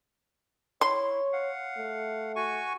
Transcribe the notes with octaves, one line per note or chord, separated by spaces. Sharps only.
E4 C#5 C6
F5 F#5
A3
F#4 G#5 C#6